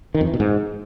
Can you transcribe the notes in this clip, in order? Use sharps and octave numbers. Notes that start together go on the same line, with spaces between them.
D#3
F2
E3
B2
G#2